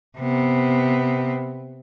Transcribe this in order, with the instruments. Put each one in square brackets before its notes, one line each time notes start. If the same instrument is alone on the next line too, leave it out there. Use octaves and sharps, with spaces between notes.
[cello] C3 B3